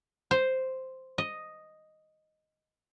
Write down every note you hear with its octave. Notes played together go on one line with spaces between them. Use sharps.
C5
D#5